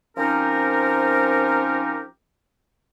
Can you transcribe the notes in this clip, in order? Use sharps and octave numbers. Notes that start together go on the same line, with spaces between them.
F3 C4 C#4 D#4 G4 A#4